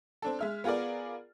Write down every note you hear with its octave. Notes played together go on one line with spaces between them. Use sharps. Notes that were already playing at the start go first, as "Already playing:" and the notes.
C4 D4 A4
G#3 E5 F6
B3 F4 G#4 A#4 D5